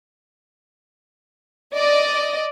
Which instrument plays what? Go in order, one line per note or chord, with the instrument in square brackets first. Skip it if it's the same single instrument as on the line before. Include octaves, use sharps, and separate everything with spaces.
[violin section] D5 D#5